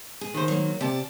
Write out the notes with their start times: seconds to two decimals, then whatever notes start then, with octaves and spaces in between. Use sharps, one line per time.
0.21 G#4
0.34 D#3 C5
0.48 F#3 A#3
0.81 C3 D5 A5